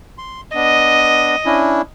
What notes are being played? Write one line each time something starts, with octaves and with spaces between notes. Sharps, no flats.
C6
B3 D4 D#5
C#4 D4 E4